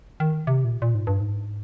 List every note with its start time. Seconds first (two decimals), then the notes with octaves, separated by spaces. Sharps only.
0.20 D#3
0.47 C3
0.64 A#2
0.82 A#2
0.95 G#2
1.07 G2
1.20 G#2